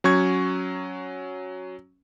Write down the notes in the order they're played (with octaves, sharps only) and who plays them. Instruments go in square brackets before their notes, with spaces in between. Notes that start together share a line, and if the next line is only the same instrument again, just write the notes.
[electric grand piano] F#3 C#4 C#6 G#6